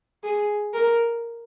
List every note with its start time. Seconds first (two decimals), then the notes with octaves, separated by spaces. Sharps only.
0.24 G#4
0.74 A#4